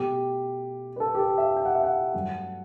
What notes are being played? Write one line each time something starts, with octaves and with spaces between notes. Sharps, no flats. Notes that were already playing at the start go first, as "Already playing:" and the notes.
Already playing: B2 A3 G4
B4
A4
G4
A4
E5
G5
F#5
E5
F#5
G2 F#3 A3